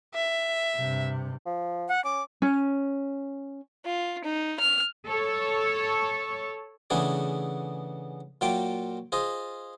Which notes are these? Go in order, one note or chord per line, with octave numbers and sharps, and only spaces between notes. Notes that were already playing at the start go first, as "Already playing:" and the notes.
E5
G2 C3
F3
F#5
C#4 D6
C#4
F4
D#4
F6
A4 C#5
C#3 E3 A3 B3 D4 G#4
A#2 F#3 F4 G5 D6
F4 G#4 C5 D#5